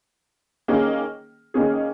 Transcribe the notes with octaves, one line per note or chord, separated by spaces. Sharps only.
D#3 A#3 C#4 G#4
D#3 A#3 C#4 G#4